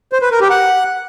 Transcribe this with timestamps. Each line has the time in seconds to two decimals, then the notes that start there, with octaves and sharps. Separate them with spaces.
0.13 C5
0.22 B4
0.31 A#4
0.41 G4
0.50 F#5